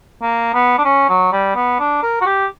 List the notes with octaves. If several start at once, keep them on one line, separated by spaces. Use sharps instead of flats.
A#3
B3
D4
C#4
F#3
G3
B3
D4
A#4
F#4
G4